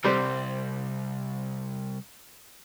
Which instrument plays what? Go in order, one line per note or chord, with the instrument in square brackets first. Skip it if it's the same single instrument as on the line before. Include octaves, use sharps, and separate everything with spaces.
[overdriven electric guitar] C2 [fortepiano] G3 C4 G4